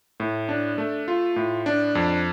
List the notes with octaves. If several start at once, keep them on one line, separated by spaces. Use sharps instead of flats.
A2
D4
A3
F4
A2
D4
F2